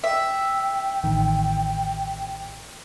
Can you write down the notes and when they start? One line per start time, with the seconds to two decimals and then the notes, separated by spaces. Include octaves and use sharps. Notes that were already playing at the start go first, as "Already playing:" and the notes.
0.04 E5 G5
1.04 A1 D#3